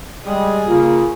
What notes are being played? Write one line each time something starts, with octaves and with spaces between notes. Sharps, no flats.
G3 G#3 G#4
C#3 A#3 F4